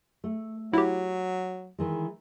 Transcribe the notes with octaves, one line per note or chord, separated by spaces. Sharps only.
A3
F#3 E4 F#4 G4
D#3 E3 G#3